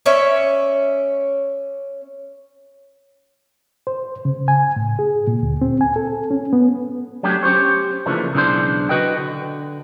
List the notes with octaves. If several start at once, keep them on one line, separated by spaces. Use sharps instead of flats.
C#4 C#5 D5 E5
C5
C#3
G#5
A2
G#4
A#2
D2
C4
G#5
A4
C#4
B3
F#3 A3 C#4 D4 G4
C#4 G4 C5 C#5
C#3 E3 F3 A3 A#3 D4
B1 C#3 E3 G3 D4 C5
F#4 B4 D#5 G5
D3